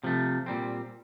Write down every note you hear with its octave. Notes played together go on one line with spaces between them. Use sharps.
C3 F3 A3
A#2 G3 C4